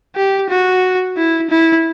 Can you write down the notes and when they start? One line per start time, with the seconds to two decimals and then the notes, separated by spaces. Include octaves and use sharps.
0.16 G4
0.49 F#4
1.17 E4
1.50 E4